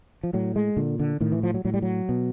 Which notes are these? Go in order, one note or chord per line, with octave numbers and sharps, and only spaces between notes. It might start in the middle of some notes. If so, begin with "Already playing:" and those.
F3
A2 F#3
G#3
A#2 D3
D3
A2 D#3
E3
F3
F#3
A2 F#3
G3
F#3
B2